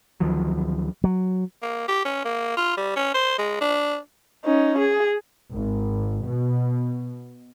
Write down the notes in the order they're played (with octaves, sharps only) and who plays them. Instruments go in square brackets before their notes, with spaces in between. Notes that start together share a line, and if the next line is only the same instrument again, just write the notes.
[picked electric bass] D2 D#3 F3 F#3
[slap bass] F#3
[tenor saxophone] A#3
G4
C#4
A#3
F4
G3
C#4
C5
G#3
D4
[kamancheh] C#4 D#4
G#4
[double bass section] G#1
B2